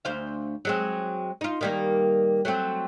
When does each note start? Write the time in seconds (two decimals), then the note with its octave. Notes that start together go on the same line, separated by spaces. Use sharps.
0.05 D2 C5 F5
0.65 F#3 G#3 C4
1.41 D#4 F4
1.61 D#3 G3 A#3
2.45 F#3 A3 C4